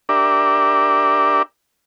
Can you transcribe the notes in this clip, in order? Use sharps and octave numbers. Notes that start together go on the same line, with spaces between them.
D4 G4 A#4 D5 E5